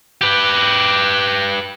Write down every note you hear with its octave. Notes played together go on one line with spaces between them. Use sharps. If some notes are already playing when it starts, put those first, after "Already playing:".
G4 B4